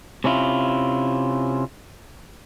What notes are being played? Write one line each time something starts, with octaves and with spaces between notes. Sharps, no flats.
C3 C#4 E4 F4